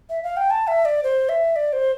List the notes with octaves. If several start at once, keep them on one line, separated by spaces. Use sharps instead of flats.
E5
F5
G5
A5
E5
D5
C5
E5
D5
C5